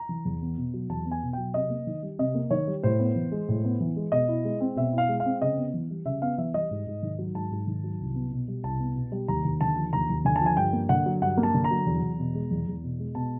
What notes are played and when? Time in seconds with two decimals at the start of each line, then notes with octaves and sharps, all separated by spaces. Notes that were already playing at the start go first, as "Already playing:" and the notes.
Already playing: A#5
0.09 E3
0.25 E2
0.42 B3
0.58 B2
0.74 F#3
0.89 E2 A5
1.06 B3
1.11 G#5
1.22 B2
1.33 F#3 G5
1.54 C3 D#5
1.70 A#3
1.87 D#3
2.03 G3
2.19 C3 D#5
2.35 A#3
2.51 D#3 C#5
2.67 G3
2.83 A2 C5
2.99 B3
3.16 E3
3.32 G#3
3.49 A2
3.65 B3
3.80 E3
3.96 G#3
4.12 B2 D#5
4.29 E4
4.44 G#3
4.60 C4
4.76 B2 E5
4.93 E4
4.98 F5
5.09 G#3
5.20 F5
5.25 C4
5.42 C#3 D#5
5.57 B3
5.74 E3
5.90 G3
6.05 C#3 E5
6.22 B3 F5
6.38 E3 E5
6.54 G3 D#5
6.71 G#2
6.87 G#2
7.03 D#3
7.19 F#3
7.35 G#2 A5
7.51 G#2
7.67 D#3
7.84 F#3
8.00 C2
8.15 B3
8.32 B2
8.48 G3
8.63 C2 A5
8.80 B3
8.96 B2
9.12 G3
9.28 D#2 A#5
9.45 D#2
9.61 D3 A5
9.77 F3
9.93 D#2 A#5
10.10 D#2
10.25 D3 G#5
10.36 A5
10.41 F3
10.46 G#5
10.57 G2 G5
10.73 A#3
10.89 D3 F#5
11.06 F#3
11.22 G2 F#5
11.37 A#3
11.43 A5
11.54 D3
11.64 A#5
11.71 F#3
11.86 E2
12.03 E2
12.19 B2
12.35 G#3
12.51 E2
12.67 E2
12.84 B2
12.99 G#3
13.15 B2 A5